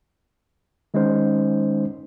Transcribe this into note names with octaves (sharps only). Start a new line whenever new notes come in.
D#3 G#3 C#4 D#4 C5